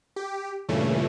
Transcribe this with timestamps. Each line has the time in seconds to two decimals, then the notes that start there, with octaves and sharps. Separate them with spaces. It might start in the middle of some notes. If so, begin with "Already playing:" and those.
0.16 G4
0.69 G2 A#2 C#3 E3 A3